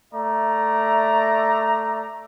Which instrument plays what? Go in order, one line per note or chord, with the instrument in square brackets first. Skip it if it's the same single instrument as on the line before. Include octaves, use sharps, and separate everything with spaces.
[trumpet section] A3 D5 E5 A#5